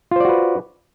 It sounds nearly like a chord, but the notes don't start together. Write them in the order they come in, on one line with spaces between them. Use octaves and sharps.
F4 C5 D5 F#4 B4